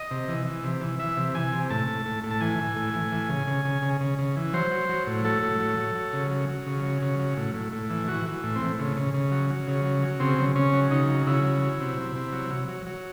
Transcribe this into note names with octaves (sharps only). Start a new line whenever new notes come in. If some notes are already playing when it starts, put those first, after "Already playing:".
Already playing: D#5
C3
E3
E3
C3
E3
E3 E5
C3
E3 G#5
C3
A2 A5
A2
A2
A2
A5
E3 G#5
E3
A2
A2
E3
C#3
C#3
C#3
C#3
C#3
C#3
E3
F#3 C5
F#3
F#3
A2
F#3 A4
A2
F#3
F#3
F#3
C#3
F#3
F#3
C#3
F#3
C#3
F#3
A2
A2
A2
E3
E3 F#4
E3
A2
C4
A2
C#3
C#3
C#3
F#3
F#3
C#3
F#3
F#3
C#3 C4
C#3
C#3 C#4
F#3
C#3 D#4
F#3
C#3 E4
F#3
F#3
C3
C3
C3
F#3
F#3
F#3
F#3